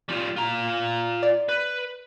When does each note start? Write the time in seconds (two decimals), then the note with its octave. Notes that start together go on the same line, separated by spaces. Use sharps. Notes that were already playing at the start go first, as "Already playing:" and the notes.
0.09 G3 F4
0.37 F4 A#5
1.23 D5
1.49 B4